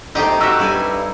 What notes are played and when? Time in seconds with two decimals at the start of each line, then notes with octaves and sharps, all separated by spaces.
0.15 A#1 A3 C4 D#4 G4 G5
0.41 F#4 G4 E5 E6 D7 D#7
0.59 G2 E4 A4 G#5